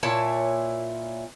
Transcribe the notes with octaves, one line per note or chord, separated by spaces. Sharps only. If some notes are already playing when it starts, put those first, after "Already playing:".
A#2 E4 C#5 A5